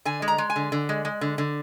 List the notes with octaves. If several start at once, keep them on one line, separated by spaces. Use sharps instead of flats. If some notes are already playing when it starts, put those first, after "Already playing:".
D3 G#5
G#3
A#5
G#3
G#5
D3
D3
G#3
G#3
D3
D3